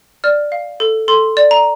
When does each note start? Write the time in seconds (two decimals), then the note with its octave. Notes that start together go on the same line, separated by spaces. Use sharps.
0.24 D5 F6
0.52 F5
0.80 A4
1.08 A4 C6
1.37 D5
1.51 A#5